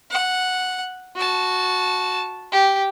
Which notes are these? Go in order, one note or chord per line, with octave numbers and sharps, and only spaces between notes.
F#5
F#4 A5
G4